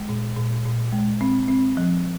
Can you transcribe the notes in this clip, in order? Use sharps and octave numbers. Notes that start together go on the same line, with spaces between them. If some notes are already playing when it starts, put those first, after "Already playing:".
Already playing: G#3
A#2
A#2
A#2
G#3
C4
C4
F3